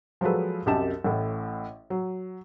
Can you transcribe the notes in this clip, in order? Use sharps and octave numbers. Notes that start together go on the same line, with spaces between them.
F3 F#3 G#3 A4 B4
C2 F#2 G4 D#5 A5 E7
A1 A2
F#3